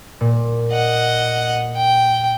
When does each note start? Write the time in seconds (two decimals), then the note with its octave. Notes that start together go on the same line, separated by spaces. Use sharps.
0.21 A#2
0.72 D#5 F#5
1.77 G5